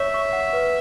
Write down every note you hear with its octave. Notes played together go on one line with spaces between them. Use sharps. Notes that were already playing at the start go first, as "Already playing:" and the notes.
Already playing: C#5 E5 C#6
C#6
F#5
B4